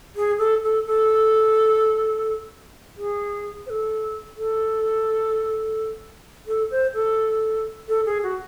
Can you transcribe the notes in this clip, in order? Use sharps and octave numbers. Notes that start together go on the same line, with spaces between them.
G#4
A4
A4
A4
G#4
C5
A4
A4
A4
C5
A4
A4
G#4
F#4